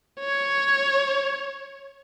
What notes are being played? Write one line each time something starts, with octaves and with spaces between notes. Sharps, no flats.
C#5